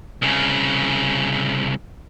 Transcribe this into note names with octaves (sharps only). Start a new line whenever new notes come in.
C2 C#3